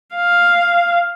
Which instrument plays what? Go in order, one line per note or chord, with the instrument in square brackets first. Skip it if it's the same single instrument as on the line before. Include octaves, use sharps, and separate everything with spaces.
[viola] F5